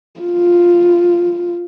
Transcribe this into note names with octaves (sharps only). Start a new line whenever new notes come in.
F4